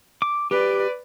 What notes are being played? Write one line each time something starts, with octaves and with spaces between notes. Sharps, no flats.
D6
G4 B4 D5